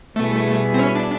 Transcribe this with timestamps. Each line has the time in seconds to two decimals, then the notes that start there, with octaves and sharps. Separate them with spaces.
0.16 B2 G3 A3 B3 E4 G#4
0.74 C4
0.79 C#4
0.95 D4